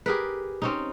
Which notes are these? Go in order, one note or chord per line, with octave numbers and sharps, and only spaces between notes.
G4 G#4 A#4 B4
C4 C#4 D#4